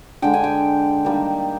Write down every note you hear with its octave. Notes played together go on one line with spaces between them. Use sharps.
D3 G#3 G5
G#5
G5
D#3 G3 A#3